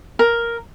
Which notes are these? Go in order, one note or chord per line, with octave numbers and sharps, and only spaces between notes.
A#4